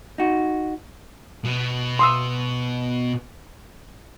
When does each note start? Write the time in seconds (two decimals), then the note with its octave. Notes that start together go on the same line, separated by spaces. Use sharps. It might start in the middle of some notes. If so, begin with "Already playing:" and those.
0.18 D#4 F#4
1.45 B2
1.99 C6 D#6 E6